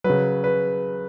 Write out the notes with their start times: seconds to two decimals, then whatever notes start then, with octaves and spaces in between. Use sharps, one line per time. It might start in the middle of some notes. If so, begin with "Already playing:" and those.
0.04 F#3 B4
0.09 C#3
0.44 B4